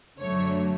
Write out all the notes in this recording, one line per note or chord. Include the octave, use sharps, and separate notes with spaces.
F#2 D3 F#3 A3 C#5